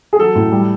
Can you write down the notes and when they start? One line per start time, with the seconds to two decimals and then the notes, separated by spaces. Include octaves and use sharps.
0.13 G#4
0.19 F#3 A4
0.35 A2
0.52 G3